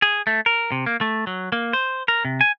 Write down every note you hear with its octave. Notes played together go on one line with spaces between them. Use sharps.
G#4
A3
A#4
C3
A#3
A3
F#3
A#3
C5
A#4
C3
G#5